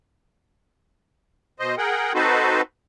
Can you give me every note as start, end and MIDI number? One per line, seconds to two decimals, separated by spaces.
1.60 1.75 47
1.60 1.75 72
1.60 1.75 75
1.78 2.13 68
1.78 2.13 70
1.78 2.13 78
1.78 2.13 79
2.14 2.61 60
2.14 2.61 63
2.14 2.61 66
2.14 2.61 69
2.14 2.61 71
2.14 2.61 72